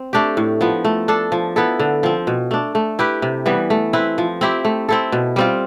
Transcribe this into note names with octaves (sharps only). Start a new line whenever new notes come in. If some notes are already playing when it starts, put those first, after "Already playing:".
Already playing: C4
A3 D4 G4
A2
F3 B3
A3
D4 A4
F3
B3 E4 A4
D3
F3 C4
B2
A3 D4
A3
E4 G4 B4
C3
E3 G3 B3
A3
C4 E4 B4
F3
C4 E4 G4
A3
C4 E4 A4
B2
G3 C4 F4